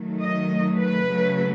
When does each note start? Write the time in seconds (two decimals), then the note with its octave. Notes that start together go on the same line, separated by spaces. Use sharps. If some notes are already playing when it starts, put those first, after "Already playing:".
Already playing: D#3 F#3 A3
0.21 D#5
0.79 B4
1.07 C#3 F#3 A3